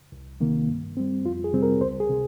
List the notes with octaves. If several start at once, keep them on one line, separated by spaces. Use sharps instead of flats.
C2
C3 D#3 A#3
G2
G3 C4
F2 F4
G#4
C3 G3 C4
A#4
C#2 C5
G#4
C3